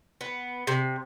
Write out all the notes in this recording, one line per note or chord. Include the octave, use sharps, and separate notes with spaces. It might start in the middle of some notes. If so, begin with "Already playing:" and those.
B3
C3